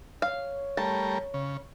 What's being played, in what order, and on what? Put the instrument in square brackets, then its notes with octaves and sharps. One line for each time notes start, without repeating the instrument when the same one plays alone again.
[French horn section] C#5 [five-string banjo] F5
[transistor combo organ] G3 A3 A#4 [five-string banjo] A5
[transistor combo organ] C#3